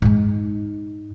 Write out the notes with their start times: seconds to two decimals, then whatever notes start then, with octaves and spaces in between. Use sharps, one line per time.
0.02 G#2 D#4